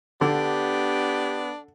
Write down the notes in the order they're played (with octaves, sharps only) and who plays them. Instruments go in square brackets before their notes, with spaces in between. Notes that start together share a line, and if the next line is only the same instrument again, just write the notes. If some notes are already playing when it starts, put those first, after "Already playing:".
[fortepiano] D3 [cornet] B3 [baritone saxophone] D4 [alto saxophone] G4